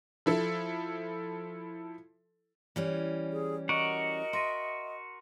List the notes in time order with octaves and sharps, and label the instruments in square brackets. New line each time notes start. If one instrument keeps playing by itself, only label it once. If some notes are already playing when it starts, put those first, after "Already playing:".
[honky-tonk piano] F3 E4 A4
[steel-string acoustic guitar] E3 G3 C#4 [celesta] D5
[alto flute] G#4
[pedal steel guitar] F#4 A#4 F#5 [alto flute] D#5 [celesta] C#6 D6 C#7
[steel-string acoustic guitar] E5 [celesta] C6 A#6 D#7